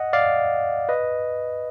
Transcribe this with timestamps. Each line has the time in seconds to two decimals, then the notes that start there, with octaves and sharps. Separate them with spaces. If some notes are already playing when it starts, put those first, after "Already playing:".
Already playing: D#5 F#5
0.13 D5 F5
0.89 B4 D#5